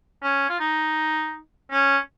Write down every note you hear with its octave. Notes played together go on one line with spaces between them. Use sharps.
C#4
F4
D#4
C#4